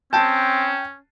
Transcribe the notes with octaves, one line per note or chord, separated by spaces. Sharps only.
C4 C#4 G5 A5 G6